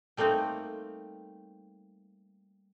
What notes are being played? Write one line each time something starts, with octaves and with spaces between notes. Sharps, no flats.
G3 A3 A#3 C4 D#4